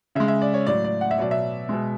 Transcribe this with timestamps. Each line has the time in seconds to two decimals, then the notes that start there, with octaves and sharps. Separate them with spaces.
0.15 C#3 E5
0.20 G#3
0.28 E5
0.42 D5
0.54 C#5
0.66 A2 F#3 D5
0.84 D5
1.01 F#5
1.11 E5
1.18 B2 F#3 D5
1.31 E5
1.69 B2 G#3